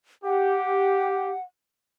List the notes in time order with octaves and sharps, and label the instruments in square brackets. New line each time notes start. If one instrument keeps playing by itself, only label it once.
[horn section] G4 [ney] F#5